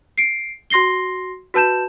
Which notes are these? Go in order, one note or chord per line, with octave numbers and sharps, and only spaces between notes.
C7 D7
F#4 C6 A#6 C7 G7
F#4 B4 A5 G6 E7